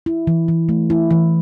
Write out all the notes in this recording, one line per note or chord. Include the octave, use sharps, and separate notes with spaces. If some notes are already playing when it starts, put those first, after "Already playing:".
E4
E3
E3
A3
E4
E3